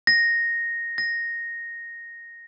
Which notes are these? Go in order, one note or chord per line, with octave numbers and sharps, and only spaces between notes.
A#6
A#6